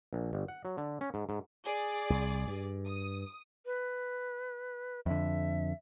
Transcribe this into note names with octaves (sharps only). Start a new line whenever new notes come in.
A#1
G1
F#5
F#3
D3
C#4
G#2
G#2
G#4 D5
C2
G2
D#6
B4
F2 D3 E5